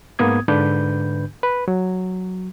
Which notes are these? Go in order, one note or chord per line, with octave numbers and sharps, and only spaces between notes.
G#2 A#3 B3 D#6 G#6
G#2 D3 D4 B4 G6
B4
F#3